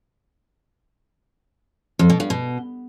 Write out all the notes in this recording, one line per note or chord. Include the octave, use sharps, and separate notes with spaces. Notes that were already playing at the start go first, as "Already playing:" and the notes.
F2
B2
G2
B2